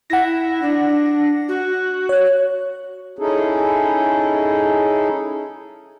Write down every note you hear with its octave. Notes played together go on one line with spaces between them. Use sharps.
E4 F#5 A#6
D4
F#4
C#5 F#6
C#4 D#4 E4 G#4 A4